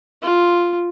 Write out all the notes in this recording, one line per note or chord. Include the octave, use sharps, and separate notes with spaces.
F4